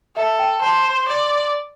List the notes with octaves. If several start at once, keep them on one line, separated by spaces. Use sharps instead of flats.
A4 E5
G5
C5 A5
C6
D5